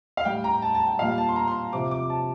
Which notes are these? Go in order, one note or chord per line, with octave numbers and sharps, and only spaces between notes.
F5
A2 G3 G5
A#5
A5
A5
G5
A#2 G3 F5
A5
C6
A#5
C6
C3 F3 D6
D6
A5